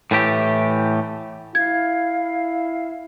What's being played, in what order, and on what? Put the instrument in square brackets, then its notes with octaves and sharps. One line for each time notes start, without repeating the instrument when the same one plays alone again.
[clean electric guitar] A2 E3 A3 G4
[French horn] E4 [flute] F5 [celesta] G#6